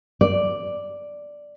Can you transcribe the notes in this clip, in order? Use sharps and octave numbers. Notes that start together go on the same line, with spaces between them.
D5